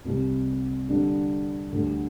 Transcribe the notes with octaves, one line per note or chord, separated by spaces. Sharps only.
C2 C3 G3
D3 G3 D4
D2 D3 G3